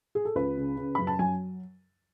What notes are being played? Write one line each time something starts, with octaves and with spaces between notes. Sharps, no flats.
G#4
A4
C#2 B4
C#3
C#3
F#2 B5
A5
F#3 G#5